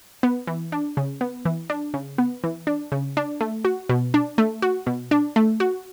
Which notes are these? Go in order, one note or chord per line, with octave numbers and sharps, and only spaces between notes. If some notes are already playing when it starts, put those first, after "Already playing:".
B3
E3
D4
C#3
B3
E3
D4
C#3
B3
E3
D4
C#3
D4
A3
F#4
B2
D4
A3
F#4
B2
D4
A3
F#4